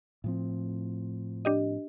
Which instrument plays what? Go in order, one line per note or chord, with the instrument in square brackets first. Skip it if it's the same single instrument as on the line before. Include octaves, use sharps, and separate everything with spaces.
[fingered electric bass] A2 F3 C4
[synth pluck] D4 G4 D#5